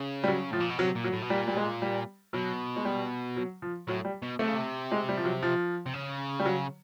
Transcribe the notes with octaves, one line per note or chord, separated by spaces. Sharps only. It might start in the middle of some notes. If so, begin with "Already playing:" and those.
Already playing: C#3
G3
F#3
A2 F3
A#2
B2
C3 F#3
A#2
F#3
A2
B2
A#2 G3
G3
G#3
G3
B2 F#3
G#3
G3
F#3
F3
A2 F#3
G3
B2
C3 A3
C#3
C3
G#3
G3
F3
F#3
F3
C3
C#3
G3
F#3